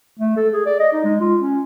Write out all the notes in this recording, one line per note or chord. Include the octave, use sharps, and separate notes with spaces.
A3
A4
G#4
D5
D#5
D#4
G#3
F4
C#4